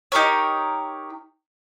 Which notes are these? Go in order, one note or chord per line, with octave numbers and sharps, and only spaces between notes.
D#4 G4 A#4 C#5